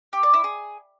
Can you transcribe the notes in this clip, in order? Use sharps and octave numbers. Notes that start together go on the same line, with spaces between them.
G4
D5
E4
G#4